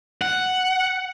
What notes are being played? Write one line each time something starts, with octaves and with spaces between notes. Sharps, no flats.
F#5